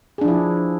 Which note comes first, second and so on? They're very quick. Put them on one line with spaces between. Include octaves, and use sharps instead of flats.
G#4 D4 F3 E4